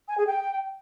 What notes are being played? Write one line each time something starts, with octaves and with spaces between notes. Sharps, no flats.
G#5
G#4
G5